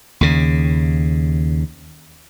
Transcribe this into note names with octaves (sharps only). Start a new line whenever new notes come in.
D#2 C#3